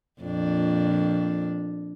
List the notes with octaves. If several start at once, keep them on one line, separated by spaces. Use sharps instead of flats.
F2 A#2 D4